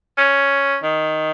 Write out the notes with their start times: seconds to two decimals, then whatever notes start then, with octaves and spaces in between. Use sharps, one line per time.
0.18 C#4
0.83 D#3